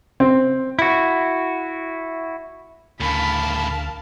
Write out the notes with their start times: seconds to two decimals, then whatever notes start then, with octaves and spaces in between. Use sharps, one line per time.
0.20 C4
0.79 E4 F#4
3.00 D2 A2 C#3 A#4 F5 A5 B5